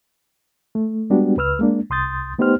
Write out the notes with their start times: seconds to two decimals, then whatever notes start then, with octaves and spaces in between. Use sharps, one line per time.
0.75 A3
1.10 G3 G#3 B3 D4 F#4 G4
1.37 C#2 B4 E6 F6
1.59 G#3 A#3 D4
1.90 C2 C6 D#6 G6 A6
2.39 A3 B3 D#4 G4 C5 F6